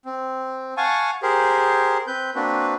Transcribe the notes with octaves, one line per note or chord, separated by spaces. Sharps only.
C4
F5 F#5 G#5 A5 C#6
G4 G#4 A#4 C5
C4 B4 G6
A#3 C4 D4 F#4 B4